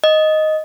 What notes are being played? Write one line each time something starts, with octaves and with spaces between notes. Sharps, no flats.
D#5